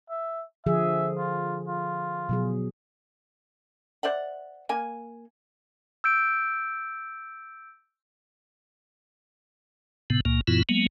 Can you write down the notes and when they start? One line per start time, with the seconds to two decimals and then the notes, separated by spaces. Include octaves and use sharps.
0.10 E5
0.66 D3 F3 G#4 E5
1.18 F4
1.68 F4
2.29 B2 F#3 G#4
4.03 C5 D5 E5 F#5
4.69 A#3 G#5
6.04 E6 G6 D7
10.10 A2 C3 B3
10.25 C#2 A#2 A#3
10.48 F#2 A#2 E3 B3 E4 F4
10.69 F#3 G#3 A#3 B3